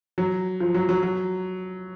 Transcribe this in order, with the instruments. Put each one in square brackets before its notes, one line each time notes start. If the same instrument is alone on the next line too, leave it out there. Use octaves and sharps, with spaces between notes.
[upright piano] F#3
F3
F#3
F#3
F#3